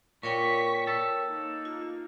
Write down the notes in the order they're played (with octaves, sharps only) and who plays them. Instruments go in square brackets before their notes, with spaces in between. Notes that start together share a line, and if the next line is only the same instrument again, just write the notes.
[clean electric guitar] A#2 [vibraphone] A#4 C#5 G5 [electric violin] C#6 B6
[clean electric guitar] A4
[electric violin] A#3 D#4
[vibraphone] F4